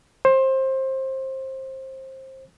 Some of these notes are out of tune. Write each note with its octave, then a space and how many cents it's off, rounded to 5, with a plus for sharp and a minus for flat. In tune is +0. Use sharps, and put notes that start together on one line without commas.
C5 +20